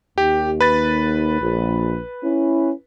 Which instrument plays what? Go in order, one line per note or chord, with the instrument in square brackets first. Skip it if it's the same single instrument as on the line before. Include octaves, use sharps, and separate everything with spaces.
[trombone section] D#2 [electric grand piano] G4
[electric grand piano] B4 A6
[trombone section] A#1
C#4 E4